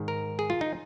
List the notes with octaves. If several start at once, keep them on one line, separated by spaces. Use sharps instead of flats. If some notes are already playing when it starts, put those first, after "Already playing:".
Already playing: G#2 D#3
A#4
G#4
F4
D#4